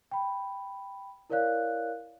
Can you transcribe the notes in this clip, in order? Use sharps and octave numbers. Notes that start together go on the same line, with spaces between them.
G5 B5
E4 A#4 C#5 D5 F5 F#6